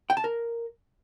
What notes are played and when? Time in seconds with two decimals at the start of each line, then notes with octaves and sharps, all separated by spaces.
0.10 G5
0.17 A5
0.24 A#4